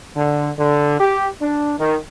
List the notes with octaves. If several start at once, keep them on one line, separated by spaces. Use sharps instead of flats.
D3
D3
G4
D4
D#3